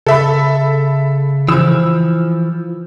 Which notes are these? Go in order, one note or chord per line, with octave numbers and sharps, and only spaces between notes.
C#3 A4 E5 B5
E3 F3 E6